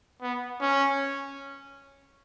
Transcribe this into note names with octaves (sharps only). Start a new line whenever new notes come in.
B3
C#4